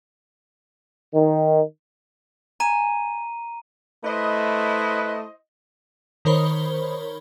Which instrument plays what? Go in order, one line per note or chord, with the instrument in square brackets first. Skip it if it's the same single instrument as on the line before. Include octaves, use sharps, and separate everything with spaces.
[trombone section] D#3
[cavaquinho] G#5 [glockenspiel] A#5 D#7
[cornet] A3 [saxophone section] E4 C5 D#5 [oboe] B4
[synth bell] D#3 A#4 C5 C#5 B5 G7